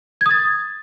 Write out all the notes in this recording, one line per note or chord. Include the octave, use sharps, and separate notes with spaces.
D#6 G#6 A6